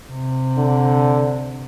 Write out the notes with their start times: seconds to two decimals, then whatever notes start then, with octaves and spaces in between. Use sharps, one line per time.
0.11 C3
0.57 D3